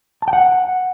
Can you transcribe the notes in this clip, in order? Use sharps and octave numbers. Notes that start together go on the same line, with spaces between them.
A5
G5
F#5